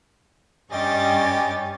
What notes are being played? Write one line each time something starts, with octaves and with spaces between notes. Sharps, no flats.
G2 G3 C#4 G4 D#5 G#5 C#6 A6